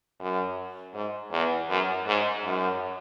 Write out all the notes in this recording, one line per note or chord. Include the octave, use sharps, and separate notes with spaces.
F#2
G#2
E2
F#2
G#2
F#2